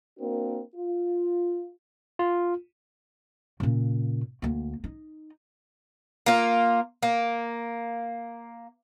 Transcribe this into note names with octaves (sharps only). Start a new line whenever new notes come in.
A#3 C4 D4 F#4 A#4
F4
F4
A#2 C#3
D2 A#3
D#4
A#3 F4
A#3